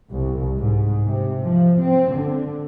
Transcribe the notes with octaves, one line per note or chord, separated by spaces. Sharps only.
C2
G#2
C3
F3
C4
D3